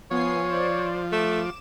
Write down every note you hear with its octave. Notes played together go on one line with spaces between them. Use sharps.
F3 B3 C#5 G#5 C7
C5 D5
A3 D6 E7